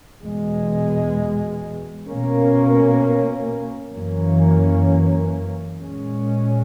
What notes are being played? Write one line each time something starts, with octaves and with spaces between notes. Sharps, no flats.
E2 B2 G#3
B2 A#3 C#4
F#2 E3 A#3 C#4
A#2 G#3 C#4